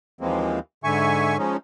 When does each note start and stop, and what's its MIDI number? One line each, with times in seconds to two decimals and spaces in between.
0.21 0.59 39
0.21 0.59 52
0.21 0.59 53
0.21 0.59 56
0.21 0.59 58
0.21 0.59 60
0.84 1.37 44
0.84 1.37 50
0.84 1.37 76
0.84 1.37 80
0.84 1.37 85
1.38 1.57 53
1.38 1.57 56
1.38 1.57 61
1.38 1.57 63